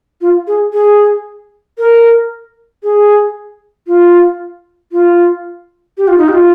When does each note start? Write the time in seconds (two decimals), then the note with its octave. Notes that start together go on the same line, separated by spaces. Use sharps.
0.21 F4
0.47 G#4
0.73 G#4
1.78 A#4
2.83 G#4
3.87 F4
4.92 F4
5.98 G4
6.08 F4
6.18 D#4
6.28 G4
6.33 F4